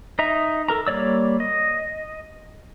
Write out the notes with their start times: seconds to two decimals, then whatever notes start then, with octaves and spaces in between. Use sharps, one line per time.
0.19 D#4 D#5 E5 A#5
0.69 A4 A#4 A#5
0.87 G3 A#3 C#5 D5 E6
1.40 D#5